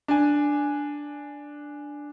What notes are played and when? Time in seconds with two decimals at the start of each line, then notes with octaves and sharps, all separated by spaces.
0.08 D4 G#5